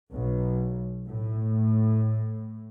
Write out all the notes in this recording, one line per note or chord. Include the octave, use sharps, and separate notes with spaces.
B1
A2